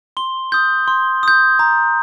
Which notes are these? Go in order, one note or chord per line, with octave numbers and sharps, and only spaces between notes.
C6 G7
D#6 G6
C6
D#6 G6
A#5